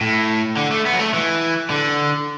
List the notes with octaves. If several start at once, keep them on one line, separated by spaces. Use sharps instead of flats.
A2
D3
A3
B3
F#3
A3
E3
D3